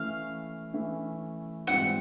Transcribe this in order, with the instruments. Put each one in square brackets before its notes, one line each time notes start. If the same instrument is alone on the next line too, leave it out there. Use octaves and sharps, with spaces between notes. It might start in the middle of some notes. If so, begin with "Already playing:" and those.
Already playing: [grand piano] E3 A3 C#4 E4 [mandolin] F5
[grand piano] E3 A3 C#4 E4
[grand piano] G#2 E3 G3 C4 F4 [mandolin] F#5